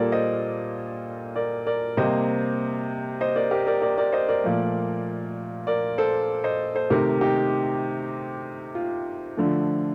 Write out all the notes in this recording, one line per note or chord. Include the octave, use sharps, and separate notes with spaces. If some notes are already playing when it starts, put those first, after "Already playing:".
Already playing: A#2 G3 A#3 F4 A4 A#4 D5
C5 D#5
A#4 D5
A#4 D5
C3 G3 A#3 C5 D#5
C5 D#5
A#4 D5
G4 A#4
A#4 D5
A#4 D5
A#4 D5
C5 D#5
A#4 D5
A#2 F3 A3
A#4 D5
A4 C5
C5 D#5
A4 C5
C3 D#3 A3 G4 A#4
D#4 G4
F4
D3 F3 A3